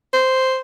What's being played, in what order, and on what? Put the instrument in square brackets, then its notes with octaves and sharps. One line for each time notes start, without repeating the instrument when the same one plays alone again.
[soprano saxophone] C5